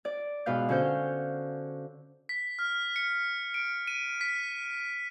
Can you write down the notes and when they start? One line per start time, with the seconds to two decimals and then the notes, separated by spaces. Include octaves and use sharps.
0.05 D5
0.46 G#2 B2 B4 F5 G6
0.69 D3 C#4 F#4 C5 F5 G6
2.29 B6
2.59 F6
2.96 C#7
3.54 D7
3.88 D#7
4.21 B6